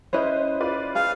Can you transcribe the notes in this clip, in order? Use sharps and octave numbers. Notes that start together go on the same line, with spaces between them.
C#4 E4 B4 C5 D#5
F4 B4 D5
G#4 F5